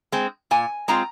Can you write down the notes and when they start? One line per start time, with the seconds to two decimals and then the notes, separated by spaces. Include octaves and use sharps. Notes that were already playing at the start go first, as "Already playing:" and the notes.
0.12 G#3 C4
0.51 A#2 G#5
0.88 G#3 C4 F4 A#5